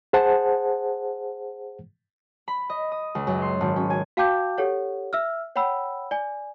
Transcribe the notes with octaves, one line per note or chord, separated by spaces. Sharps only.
G#4 C5 F#5 A5
B5
D#5
D#6
C#2
F#2
C6
G#1
C#4
G#5
F#4 F5 G5 A5 D6 G6
G4 A4 C#5 F#5
E5 E6 F6
C#5 F#5 G5 B5 E6
D5 G#5